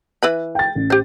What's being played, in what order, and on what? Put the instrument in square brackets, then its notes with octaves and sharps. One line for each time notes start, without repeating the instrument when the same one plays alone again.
[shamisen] E3 B4 B5
[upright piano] G5 A6
A1
[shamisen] G4 C5